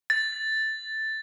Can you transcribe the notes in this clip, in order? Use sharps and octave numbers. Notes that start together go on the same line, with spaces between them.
A6